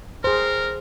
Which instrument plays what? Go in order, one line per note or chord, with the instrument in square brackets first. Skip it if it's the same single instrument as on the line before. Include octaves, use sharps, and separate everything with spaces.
[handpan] G#4 C5 [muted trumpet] A#4